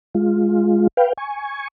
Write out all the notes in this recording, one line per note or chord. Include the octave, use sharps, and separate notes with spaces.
G#3 F4
B4 F5 G5
G#5 C#6